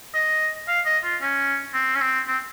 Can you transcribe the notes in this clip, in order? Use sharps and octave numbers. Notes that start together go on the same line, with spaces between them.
D#5
F5
D#5
F4
C#4
C4
C#4
C4
C4